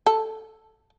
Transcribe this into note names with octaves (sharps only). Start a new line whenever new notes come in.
A4